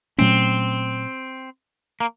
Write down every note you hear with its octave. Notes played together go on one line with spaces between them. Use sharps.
A#2 F#3 A3 C4 C#4
A#3